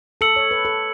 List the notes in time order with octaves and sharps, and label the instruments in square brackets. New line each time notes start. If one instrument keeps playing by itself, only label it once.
[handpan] A4 [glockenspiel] E6 C#7 F#7
[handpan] C#5
B4
A4